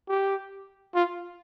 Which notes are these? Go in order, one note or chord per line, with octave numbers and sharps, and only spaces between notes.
G4
F4